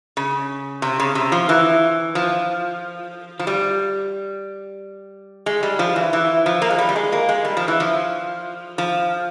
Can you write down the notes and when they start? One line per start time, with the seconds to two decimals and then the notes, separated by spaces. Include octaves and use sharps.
0.17 C#3
0.82 C3
1.00 C#3
1.15 C3
1.32 F3
1.49 E3
2.15 F3
3.39 F3
3.47 G3
5.46 G#3
5.63 G3
5.79 F3
5.96 E3
6.13 E3
6.46 F3
6.62 A#3
6.71 G#3
6.79 G3
6.89 G3
6.96 G#3
7.12 A#3
7.29 G#3
7.45 G3
7.57 F3
7.68 E3
7.80 F3
8.78 F3